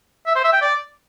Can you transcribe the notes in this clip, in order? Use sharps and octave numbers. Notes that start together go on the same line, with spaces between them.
E5
C5
E5
G5
D5